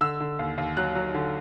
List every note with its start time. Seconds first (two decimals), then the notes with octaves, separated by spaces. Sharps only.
0.01 D3 E6
0.20 D3
0.39 D#2
0.58 D#2
0.77 F#3 F#6
0.95 F#3
1.14 D3